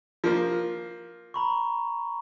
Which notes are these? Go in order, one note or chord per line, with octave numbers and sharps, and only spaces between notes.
F3 A#3
A#5 B5 C#6